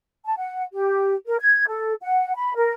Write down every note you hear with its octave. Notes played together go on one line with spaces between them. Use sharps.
A5
F#5
G4
A#4
G#6
A4
F#5
B5
A#4